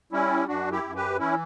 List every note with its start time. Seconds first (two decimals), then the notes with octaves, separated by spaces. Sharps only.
0.12 G3 C#4 E4
0.48 F#2 D4 F#4
0.71 E4 G4
0.83 F#2
0.95 G4 B4
1.19 E3 C#4 E4